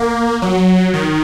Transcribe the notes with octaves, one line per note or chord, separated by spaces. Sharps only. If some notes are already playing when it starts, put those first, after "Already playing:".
Already playing: A#3
F#3
D#3